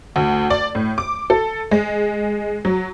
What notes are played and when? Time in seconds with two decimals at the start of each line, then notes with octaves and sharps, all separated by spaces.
0.16 D2
0.50 D5
0.75 A2
0.98 D6
1.30 A4
1.71 G#3
2.65 F#3